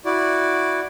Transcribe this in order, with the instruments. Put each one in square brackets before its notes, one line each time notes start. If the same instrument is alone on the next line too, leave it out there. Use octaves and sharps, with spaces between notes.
[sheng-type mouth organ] E4 F#4 D5